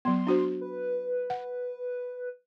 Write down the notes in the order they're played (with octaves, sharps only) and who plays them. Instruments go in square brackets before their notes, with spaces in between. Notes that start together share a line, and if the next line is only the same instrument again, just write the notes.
[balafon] F#3 B3 [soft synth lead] C6
[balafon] D4 F#4 C5
[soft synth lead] B4
[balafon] F#5